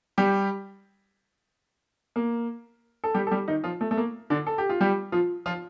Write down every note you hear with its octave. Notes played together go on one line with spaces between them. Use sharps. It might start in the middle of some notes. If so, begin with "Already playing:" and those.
G3 G4
A#3
A4
G3 G4
A4
G3 G4
D#3 D#4
F3 F4
A3
A3
A#3
D3 D4
A4
G4
F4
G3 G4
F3 F4
F3 F4